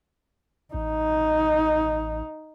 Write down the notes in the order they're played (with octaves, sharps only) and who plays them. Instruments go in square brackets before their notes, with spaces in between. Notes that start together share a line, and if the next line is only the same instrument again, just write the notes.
[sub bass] A1 [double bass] D#4